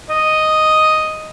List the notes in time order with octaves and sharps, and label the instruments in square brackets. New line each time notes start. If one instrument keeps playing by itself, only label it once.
[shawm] D#5